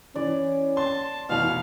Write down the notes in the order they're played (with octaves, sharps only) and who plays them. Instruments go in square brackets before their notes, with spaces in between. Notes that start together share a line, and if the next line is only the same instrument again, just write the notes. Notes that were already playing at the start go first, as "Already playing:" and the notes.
[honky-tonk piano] E3 [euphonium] C#4 [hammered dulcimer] D5
[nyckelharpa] A5 [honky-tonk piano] C6
[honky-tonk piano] F1 E3 F7 [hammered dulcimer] B2 [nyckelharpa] F5